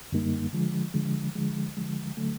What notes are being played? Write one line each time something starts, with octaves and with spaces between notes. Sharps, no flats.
F#2 D3 G3 A#3 D#4
D3 F3 G#3
D3 F3 G#3
D3 F3 G#3
D3 F3 G#3
D3 F#3 A3